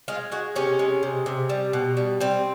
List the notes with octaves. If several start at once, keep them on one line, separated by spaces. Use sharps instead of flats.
G#3 F4
G#3 F#4
C3 C#4
G#3
C3
C3
G3
B2
G3
G3 C4